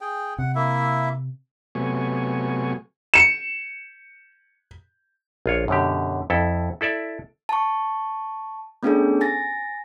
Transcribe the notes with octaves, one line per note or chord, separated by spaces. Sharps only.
G#4 G5
C3 F#5
A#3 E4 E5
C3 F#3 A3 B3 G#5 C#6
C#7 E7
A#1 F4 C#5
F#2 B2 D3 G4
F2 E4 A4
E4 A4 D5 E5
A5 C#6
A3 B3 C#4 D4 G#4 A4
G#5 A6 A#6